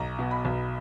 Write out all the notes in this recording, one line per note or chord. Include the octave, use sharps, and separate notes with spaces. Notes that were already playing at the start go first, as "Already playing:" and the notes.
Already playing: B1 A#5
B2
B5
B1